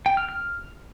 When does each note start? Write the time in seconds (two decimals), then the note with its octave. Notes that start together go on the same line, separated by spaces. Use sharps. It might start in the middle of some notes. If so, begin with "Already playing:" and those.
0.06 G5
0.17 F6
0.29 F6